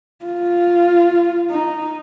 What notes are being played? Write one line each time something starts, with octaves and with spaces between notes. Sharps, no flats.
F4
D#4